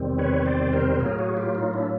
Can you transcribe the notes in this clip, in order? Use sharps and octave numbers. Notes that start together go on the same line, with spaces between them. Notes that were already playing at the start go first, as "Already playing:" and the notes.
Already playing: E2 C3 D#3 G3 C4
B4 C#5
C5 D5
A#4 C5
A2 F#3 A#3 G#4 A#4
F#4 G#4
F4 G4
D#4 F4
D4 E4